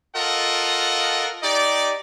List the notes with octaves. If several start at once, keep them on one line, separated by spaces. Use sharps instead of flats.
F4 A4 A#4 D#5 F#5
D#4 G4 D5